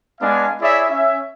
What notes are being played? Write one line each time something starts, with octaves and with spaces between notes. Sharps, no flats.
G#3 B3 D4 F5 G#5
E4 G#4 C#5 D5 E5
C#4 E5